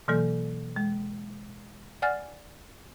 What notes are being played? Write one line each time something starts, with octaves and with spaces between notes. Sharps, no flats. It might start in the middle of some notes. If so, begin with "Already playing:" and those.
B2 E3 F#3 A#3 A4
G#3
D5 F#5 G#5 F6 A6